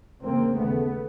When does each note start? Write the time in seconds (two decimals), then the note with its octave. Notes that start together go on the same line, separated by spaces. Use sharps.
0.22 E2 C#3 A#3 C4
0.58 D#2 C#3 A3 B3